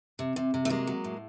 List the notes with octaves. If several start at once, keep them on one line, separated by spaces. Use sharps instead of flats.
C3
C3
C3
A3
F#3 G#3 A#3
F#3
A2